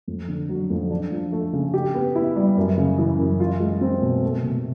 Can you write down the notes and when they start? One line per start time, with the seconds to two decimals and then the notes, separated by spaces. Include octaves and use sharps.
0.08 F2
0.28 D3
0.49 F#3
0.70 F2
0.90 D4
1.11 F3
1.32 A3
1.53 C#3
1.74 G4
1.95 B3
2.15 E4
2.36 G3
2.57 F#2
2.78 C#3
2.98 E3
3.19 F#2
3.40 F4
3.60 G#3
3.81 C4
4.02 B2
4.22 A3
4.43 C3